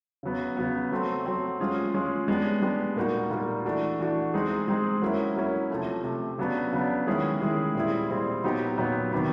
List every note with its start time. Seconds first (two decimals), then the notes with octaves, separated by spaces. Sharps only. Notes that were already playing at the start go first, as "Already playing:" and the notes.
0.23 C#3 F#3 B3
0.57 C#3 F#3 B3
0.92 F#3 A3 C4
1.25 F#3 A3 C4
1.60 G#3 C#4 F4 G#4
1.94 G#3 C#4 F4 G#4
2.28 G#3 B3 D4 G4
2.62 G#3 B3 D4 G4
2.96 A#2 G3 A#3 D#4 F#4
3.30 A#2 G3 A#3 D#4 F#4
3.65 E3 A3 D4 F#4
3.99 E3 A3 D4 F#4
4.34 G#3 C4 D#4 G#4
4.68 G#3 C4 D#4 G#4
5.02 F#3 A#3 C#4 E4
5.36 F#3 A#3 C#4 E4
5.70 C3 F3 A3
6.04 C3 F3 A3
6.38 C#3 F#3 B3 D4
6.73 C#3 F#3 B3 D4
7.07 D#3 G#3 C#4 E4 G#4
7.41 D#3 G#3 C#4 E4 G#4
7.75 A#2 G3 C4 E4 G#4
8.10 A#2 G3 C4 E4 G#4
8.44 A#2 F#3 B3 D#4 G4
8.78 A#2 F#3 B3 D#4 G4
9.12 C3 D#3 F#3 B3